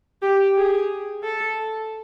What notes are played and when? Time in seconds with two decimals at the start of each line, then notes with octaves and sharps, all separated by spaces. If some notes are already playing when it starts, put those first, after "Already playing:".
0.22 G4
0.56 G#4
1.23 A4